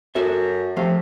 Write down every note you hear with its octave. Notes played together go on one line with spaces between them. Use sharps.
F#2 F#4 A4 E5
C3 F3 A3 F5